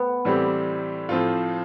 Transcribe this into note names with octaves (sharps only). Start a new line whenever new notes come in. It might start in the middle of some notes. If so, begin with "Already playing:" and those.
Already playing: B3
A2 E3 G3 C4 G4
A2 F3 C4 F4